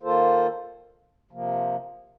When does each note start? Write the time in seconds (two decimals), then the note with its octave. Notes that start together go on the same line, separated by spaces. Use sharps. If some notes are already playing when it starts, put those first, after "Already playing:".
0.02 D#3 A#3 F4 A4 C5
1.31 C3 F3 A#3